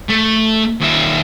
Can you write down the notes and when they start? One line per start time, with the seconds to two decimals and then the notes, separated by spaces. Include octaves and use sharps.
0.10 A3
0.81 D#2 E5